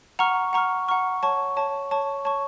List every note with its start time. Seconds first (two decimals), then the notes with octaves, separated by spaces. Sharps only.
0.19 F#5 A#5 C#6 F6
0.53 F#5 A#5 C#6 F6
0.88 F#5 A#5 C#6 F6
1.23 C#5 A5 C#6
1.57 C#5 A5 C#6
1.91 C#5 A5 C#6
2.25 C#5 A5 C#6